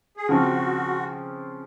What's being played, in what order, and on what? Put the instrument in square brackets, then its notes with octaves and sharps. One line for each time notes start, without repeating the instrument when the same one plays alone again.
[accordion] G#4
[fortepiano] C#3 F3 C4 [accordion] F#4